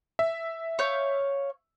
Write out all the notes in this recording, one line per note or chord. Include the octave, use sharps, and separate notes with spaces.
E5
C#5 F5 G6